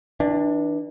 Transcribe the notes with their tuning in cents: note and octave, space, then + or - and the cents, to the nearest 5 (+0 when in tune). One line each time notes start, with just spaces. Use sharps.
E3 -30 D4 +10